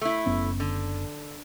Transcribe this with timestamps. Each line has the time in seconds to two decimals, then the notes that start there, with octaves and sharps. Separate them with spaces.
0.01 A3 E4
0.26 F#1 B3 C#4
0.60 D3